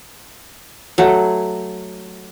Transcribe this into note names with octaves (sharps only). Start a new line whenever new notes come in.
F#3 A3 F#5